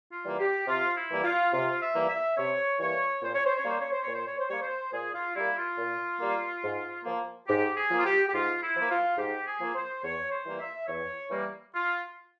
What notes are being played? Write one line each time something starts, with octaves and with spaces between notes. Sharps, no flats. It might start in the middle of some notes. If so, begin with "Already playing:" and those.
F4
E3 G3 A#3
G4
C3 F4
E4
E3 G3 A#3
F4
C3 F4
E5
E3 G3 A#3
E5
C3 C#5
E3 G3 A#3 C#5
A#2 C5
C#5
C5
C#5
G3 A#3 C5
C#5
C5
A#2 C#5
C5
C#5
C5
G3 A#3 C#5
C5
A#2 G#4
F4
G3 A#3 E4
F4
A#2
G3 A#3
G#2
F3 A#3
G#2 G4
G#4
F3 A#3
F4
G4
G4
G#2 F4
E4
F3
A#3
F4
G#2 G4
G#4
F3 A#3
C5
E2 C#5
C5
E3 G3 A#3
E5
E2 C#5
E3 G3 A#3
F4